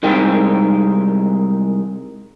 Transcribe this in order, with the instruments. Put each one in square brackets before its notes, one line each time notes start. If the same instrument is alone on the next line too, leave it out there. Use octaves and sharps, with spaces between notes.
[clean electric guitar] C2 D#3 G#3 C4 G5